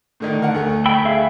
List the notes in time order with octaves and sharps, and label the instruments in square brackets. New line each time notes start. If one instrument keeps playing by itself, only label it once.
[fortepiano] A2 D3 D#3
A#4 F#5
D2 A3
[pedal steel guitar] G5 B5 E6
G#4 E5 F5